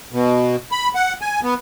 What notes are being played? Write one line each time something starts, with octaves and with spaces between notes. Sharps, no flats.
B2
B5
F#5
G#5
B3